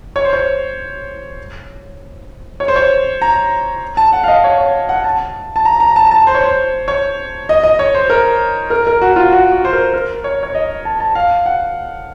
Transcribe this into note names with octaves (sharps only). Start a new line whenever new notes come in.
C#5
C5
C#5
C#5
C5
C#5
A#5
A5
F#5
F5
D#5
C#5
C#5
F#5
A5
A5
A#5
A#5
A5
A5
C5
C#5
C5
C#5
D#5
D#5
C#5
C5
A#4
A#4
A#4
F#4
F4
F#4
F#4
C5
A#4
A#4
C#5
C#5
D#5
A5
A5
F5
F#5